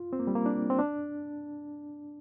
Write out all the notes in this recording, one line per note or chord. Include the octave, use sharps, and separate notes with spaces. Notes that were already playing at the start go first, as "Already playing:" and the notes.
Already playing: F4
C4
A#3
G3
A#3
D4
C4
D4